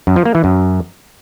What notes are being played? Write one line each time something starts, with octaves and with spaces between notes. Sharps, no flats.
F#2
F3
A#3
E3
F#2